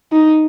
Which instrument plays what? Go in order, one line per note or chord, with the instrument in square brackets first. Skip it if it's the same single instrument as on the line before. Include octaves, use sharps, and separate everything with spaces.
[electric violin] D#4